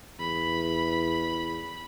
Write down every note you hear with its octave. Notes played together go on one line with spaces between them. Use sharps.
E2 B5